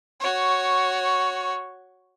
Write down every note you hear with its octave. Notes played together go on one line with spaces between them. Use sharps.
F#4 C#5